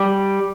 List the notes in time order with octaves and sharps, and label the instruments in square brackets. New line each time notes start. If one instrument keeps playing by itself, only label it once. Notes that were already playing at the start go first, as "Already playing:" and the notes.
Already playing: [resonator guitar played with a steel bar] G3